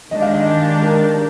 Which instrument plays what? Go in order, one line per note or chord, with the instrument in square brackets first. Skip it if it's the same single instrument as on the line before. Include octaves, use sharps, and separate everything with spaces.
[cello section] D#3 G#3 D4 G4 [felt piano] D#5
[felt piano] F5
D#5
A#4